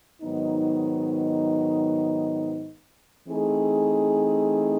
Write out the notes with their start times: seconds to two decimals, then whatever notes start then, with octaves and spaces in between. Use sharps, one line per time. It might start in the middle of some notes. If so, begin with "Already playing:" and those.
0.22 G#2 D#3 F#3 B3 D#4
3.28 E3 A3 C4 D#4 G#4